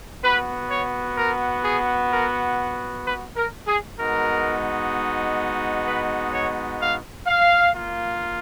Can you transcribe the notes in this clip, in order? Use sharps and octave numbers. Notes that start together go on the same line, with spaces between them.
B3 F#4 B4
C#5
A#4
G#4
A#4
B4
A#4
G#4
G#3 B3 D#4 F#4 A#4
B4
C#5
F5
F5
A#3 F4